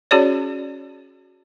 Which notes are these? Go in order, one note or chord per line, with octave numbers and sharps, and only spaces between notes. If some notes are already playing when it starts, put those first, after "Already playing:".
C#4 F#4 G#4 C#5 D5